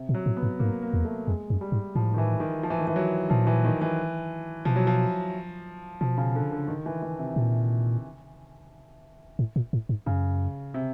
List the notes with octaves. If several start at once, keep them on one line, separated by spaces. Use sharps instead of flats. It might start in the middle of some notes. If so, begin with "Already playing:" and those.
Already playing: C3
A#2
F#3
A2
B3
G#2
G#2 A#3
A#3
E2
A3
F2 G#3
F#2
G3
G#2
A2 F3
D#3
E3
D#3
F3
E3
D#3
E3
F#3
A#2 F3
E3
D#3
E3
B2 F3
F#3
F3
B2 F3
C#3
D3
D3
D#3
E3
E3
C3
A#2
A2
A#2
A2
G#2
F#2 C#3
C3